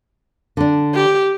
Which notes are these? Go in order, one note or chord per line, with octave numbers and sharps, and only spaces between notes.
D3 D4
G4